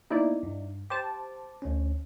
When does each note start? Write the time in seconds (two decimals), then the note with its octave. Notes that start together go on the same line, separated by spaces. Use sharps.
0.10 A#3 B3 D#4 E4 D5
0.43 G2
0.90 G4 C5 A5 D6
1.62 D2 C#4